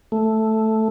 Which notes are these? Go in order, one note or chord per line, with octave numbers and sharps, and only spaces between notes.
A3